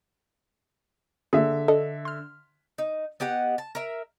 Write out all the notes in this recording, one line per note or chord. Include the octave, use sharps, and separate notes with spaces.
D3 A#3 G#4 E5
D4 A4 D#5
C6 F6
D#4
B3 G4 D#5 F#5
A5
A#4 E5